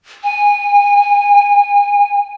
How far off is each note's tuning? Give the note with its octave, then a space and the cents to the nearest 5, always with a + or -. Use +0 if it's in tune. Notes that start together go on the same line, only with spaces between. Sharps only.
G#5 -25